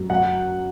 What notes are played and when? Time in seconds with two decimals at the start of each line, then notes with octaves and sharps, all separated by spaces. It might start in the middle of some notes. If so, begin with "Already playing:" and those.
Already playing: F#2
0.10 F#3 F#5